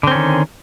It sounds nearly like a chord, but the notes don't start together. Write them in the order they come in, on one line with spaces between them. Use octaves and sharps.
D3 C4 C#4 D#3